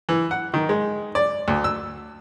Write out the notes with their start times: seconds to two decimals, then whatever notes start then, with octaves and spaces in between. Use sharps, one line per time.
0.09 E3
0.31 F#5
0.54 D#3
0.69 G#3
1.15 D5
1.48 D2
1.64 E6